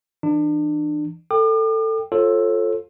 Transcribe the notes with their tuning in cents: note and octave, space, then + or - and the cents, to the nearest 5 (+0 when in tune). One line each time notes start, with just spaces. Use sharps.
E3 +0 D4 +35
A4 +15 G5 +0 D6 +45
F4 +15 A4 +0 C#5 -40